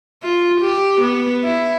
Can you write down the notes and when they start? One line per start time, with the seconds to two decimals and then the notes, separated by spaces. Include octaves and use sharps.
0.23 F4
0.61 G4
1.00 B3
1.44 E4